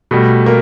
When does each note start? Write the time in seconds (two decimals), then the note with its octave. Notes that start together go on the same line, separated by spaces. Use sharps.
0.11 B2 G3 A3
0.46 A#3